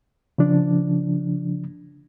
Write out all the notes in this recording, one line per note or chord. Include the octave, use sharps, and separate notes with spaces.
C#3 F3 D4